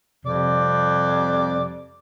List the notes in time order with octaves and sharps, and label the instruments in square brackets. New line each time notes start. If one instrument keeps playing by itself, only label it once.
[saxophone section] F2 G3 D5 [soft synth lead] C3